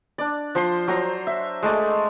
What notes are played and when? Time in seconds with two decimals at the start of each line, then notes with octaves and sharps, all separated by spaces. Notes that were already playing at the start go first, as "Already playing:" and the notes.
0.18 D4 D5
0.55 F3 C5 C6
0.88 F#3 C5 A#5
1.27 E5
1.63 G#3 A3 D5